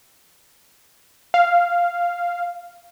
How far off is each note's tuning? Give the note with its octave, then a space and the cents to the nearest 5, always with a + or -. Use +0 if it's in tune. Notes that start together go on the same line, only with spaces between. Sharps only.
F5 -5